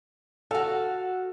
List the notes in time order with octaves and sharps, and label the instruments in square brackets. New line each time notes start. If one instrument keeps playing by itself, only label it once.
[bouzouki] F#4 F5 [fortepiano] A4